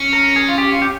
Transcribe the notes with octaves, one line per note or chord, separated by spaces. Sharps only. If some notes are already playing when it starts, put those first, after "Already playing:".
Already playing: C#4
A#4
G#4
F4
G4
F4
G4